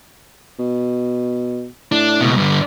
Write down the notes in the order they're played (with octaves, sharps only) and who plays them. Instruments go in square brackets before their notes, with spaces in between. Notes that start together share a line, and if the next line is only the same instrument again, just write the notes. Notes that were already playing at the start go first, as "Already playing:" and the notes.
[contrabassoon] B2
[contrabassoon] A2 [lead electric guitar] D4
[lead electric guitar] C#2 B2
G2 D3